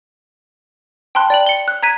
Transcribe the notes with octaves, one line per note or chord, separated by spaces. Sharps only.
G5 A5 B5 C6 F#6
D5 G5 F#7
C#7 G7
F#6
A#5 G#6 B6 D#7